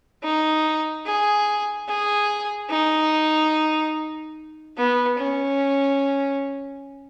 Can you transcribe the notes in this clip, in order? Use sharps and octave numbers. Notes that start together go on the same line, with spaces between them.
D#4
G#4
G#4
D#4
B3
C#4